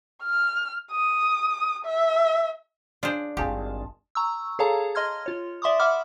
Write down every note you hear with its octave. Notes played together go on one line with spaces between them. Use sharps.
F6
D#6
E5
D4 F4 G#4 C5
G#1 G2 F4 G4 G#4 A5
A#5 C#6 E6
G#4 A4 C#5 F5 A5 A#5
D#5 C6 F6 G#6
F4 C#5
D5 E5 C6 D6 D#6
E5 F#5 B5 D6 F6